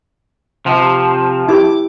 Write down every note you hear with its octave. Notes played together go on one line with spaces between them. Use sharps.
C3 F3
E4 G4 D6